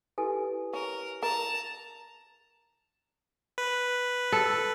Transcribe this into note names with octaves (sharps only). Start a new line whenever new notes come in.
E4 G4 A4 B4 G#5
C#4 A#4
A#4 A5 A#5
B4
A4